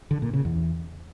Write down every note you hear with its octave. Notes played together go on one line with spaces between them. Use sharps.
D3
A#2
C#3
E2